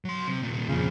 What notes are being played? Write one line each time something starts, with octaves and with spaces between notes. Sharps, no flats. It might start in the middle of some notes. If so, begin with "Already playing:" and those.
F#3 C6
C3
D#2 A#2
F2 A#2 C#3 F3